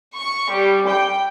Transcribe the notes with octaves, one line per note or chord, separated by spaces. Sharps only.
C#6
G3
G5